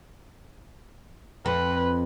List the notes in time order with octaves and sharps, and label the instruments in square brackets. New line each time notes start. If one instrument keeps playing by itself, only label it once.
[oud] F2 [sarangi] B4